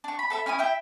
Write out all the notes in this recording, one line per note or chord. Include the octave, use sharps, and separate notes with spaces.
D4 C#6
B5
A4 E5 B5
C#4 E4 G#5 D#6
E4 E5 G5